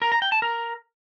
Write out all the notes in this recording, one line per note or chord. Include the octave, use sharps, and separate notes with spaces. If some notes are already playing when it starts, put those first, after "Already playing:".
A#4
A#5
G5
A5
A#4